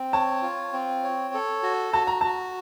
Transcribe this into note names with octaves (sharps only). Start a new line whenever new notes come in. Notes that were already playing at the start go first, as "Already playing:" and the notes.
Already playing: C4
C#5 A5
F4
C4
C#5
A4
F#4
F#4 A5
A#5
A5
F#4